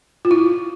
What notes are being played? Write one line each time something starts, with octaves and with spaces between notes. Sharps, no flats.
F4
E4